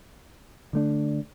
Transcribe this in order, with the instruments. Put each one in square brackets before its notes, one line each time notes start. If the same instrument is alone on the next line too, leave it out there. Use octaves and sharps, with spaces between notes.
[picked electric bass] D3 A3 D4